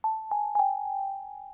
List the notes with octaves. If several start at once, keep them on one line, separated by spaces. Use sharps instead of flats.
A5
G#5
G#5
G5